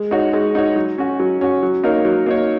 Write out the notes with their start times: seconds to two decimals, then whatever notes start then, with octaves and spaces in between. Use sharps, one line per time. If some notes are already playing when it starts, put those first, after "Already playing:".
Already playing: G#3
0.11 D#4 F#4 C#5
0.33 G#3
0.55 D#4 F#4 C#5
0.76 F#3
0.98 C#4 F#4
1.20 F#3
1.41 C#4 F#4
1.63 F#3
1.84 A#3 D#4 A#4 C#5
2.05 F#3
2.26 A#3 D#4 A#4 C#5